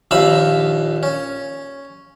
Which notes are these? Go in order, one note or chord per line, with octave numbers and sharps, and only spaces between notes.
A#1 D#2 E5 F5 B5
C#4